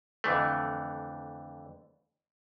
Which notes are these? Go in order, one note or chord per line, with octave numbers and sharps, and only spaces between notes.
F2 D3 E3 A3